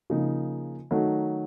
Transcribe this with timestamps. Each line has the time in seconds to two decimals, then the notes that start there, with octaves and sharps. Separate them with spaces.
0.10 C#3 F3 A#3 D#4
0.91 D#3 F#3 A3 D#4